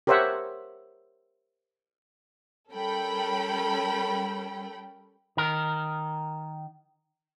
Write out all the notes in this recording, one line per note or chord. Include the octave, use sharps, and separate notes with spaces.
G4 A#4 C5 C#5 E5 F#5
G3 C#4 A4 A#4 G5 B5
D#3 A#4